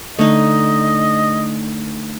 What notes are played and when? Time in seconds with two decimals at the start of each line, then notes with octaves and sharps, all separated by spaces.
0.19 D3 A3 D#4 D#5